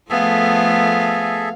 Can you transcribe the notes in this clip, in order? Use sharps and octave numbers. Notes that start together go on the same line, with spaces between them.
F3 A3 B3 G#4 A4 E5 F5